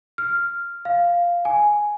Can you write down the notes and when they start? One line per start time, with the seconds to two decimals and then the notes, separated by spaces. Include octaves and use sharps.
0.18 F6
0.85 F5
1.45 G#5